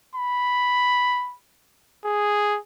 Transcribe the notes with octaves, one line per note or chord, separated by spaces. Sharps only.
B5
G#4